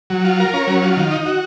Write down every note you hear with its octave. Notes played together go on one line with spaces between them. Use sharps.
F#3
F4
A#4
C#4
F#3
F4
D#3
D#4
F#4